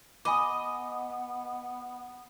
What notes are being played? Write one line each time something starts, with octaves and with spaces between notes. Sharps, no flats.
B3 D#5 G#5 B5 D6